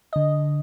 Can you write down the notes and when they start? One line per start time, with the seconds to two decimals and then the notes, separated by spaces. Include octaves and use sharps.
0.13 D3 D#5